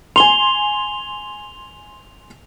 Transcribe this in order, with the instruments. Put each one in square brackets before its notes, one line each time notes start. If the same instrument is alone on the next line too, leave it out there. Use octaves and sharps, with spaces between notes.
[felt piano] G#5 C6 [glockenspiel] F7 G7